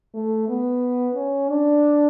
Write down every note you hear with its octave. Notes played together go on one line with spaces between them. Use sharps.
A3
B3
C#4
D4